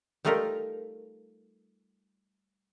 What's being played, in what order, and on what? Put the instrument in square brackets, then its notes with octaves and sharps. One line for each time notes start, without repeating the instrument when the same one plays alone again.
[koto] G3 A3 D#4 F4 A#4